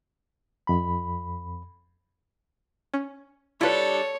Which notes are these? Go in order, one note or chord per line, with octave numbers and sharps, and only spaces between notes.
F2 B5
C#4
G3 D4 E4 F4 A4 B4 C#5